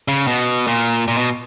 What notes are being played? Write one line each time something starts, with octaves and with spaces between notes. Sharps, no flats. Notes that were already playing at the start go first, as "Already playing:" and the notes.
C#3
B2
A#2
A#2
B2